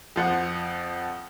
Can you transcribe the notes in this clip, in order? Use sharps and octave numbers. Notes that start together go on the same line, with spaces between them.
F2 F3 F#5